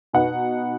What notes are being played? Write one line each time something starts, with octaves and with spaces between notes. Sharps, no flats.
B2 B3 D#4 F#5